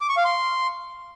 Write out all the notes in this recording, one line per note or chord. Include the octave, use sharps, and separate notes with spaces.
D6
C#6
F5
C6